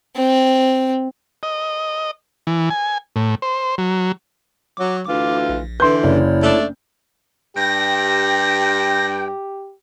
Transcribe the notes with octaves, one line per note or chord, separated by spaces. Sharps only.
C4
D#5
E3
G#5
A2
C5
F#3
F#3 D6
D2 E3 F4 D6
A#1
D3 E3 B4 C6 G6
F#1 E4 C#5 D5
A3 D4
G2 G4 G5 A#6